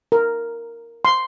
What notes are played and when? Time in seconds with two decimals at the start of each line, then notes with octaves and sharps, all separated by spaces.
0.12 A#4
1.05 C6